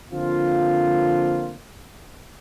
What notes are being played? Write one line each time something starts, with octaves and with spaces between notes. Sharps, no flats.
D3 F3 A#3 C4 F4